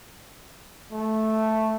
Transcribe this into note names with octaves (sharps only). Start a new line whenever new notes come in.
A3